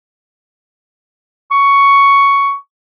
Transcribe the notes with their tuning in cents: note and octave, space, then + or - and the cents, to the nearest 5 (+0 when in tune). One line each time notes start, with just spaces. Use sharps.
C#6 +5